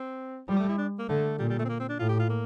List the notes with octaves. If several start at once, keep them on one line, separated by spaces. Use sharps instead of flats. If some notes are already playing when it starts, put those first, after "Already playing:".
Already playing: C4
F3 G3
A3
E4
D4
A#3
D3 A3
A#2 G3
G3
A3
C4
A#3
C4
D4
A2 F4
G4
F4
A#3